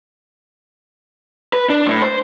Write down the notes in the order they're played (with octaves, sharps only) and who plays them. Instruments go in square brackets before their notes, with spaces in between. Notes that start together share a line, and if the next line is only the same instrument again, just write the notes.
[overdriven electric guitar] B4
D4
A2
C5